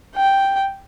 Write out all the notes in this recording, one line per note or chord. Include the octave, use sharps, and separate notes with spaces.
G5